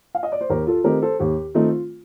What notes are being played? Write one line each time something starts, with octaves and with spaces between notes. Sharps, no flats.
F5
D#5
D5
C5
D#2 G4 A#4
F4 A4
D#3 A3 C4 D#4 G4 A#4
A4 C5
D#2 G4
D#3 A3 C4 D#4 F4